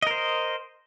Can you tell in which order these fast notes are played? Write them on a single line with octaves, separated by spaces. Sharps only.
D#5 A#4 C5